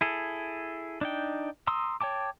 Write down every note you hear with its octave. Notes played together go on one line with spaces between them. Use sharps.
E4 G#4 A4
D4 D#4 G5
A#5 C6 D#6 E6
C#5 G5 A5 D6